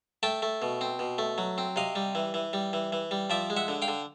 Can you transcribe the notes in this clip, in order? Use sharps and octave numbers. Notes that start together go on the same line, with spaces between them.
A3 G5 A5
A3
B2
C4
B2
A3
F#3
C4
C3 D#5 F5
G3
E3
E3
G3
E3
E3
G3
F3 D5 E5
G#3
E5 F#5
D3
F5 G5
D3